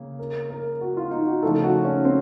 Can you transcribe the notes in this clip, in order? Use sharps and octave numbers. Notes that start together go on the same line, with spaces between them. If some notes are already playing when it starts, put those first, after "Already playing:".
Already playing: C#3 A#3
A#4
A#4
F#4
F4
D#4
F#4
C#3 F3 A3 D#4 A4
F#4
C#4
C4